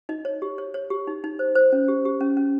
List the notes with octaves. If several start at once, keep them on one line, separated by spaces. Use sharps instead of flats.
D#4 D#5
C#5
G4
C#5
C#5
G4
D#4
D#4
C5
C5
C#4
G4
G4
C#4
C#4